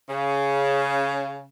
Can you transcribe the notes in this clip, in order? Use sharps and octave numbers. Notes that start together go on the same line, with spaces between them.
C#3